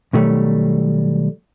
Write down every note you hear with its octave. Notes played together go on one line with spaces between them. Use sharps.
B2 D#3 F#3 G3 A3